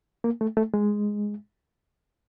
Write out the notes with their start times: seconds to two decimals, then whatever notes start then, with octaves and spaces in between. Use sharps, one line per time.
0.24 A#3
0.41 A3
0.57 A3
0.74 G#3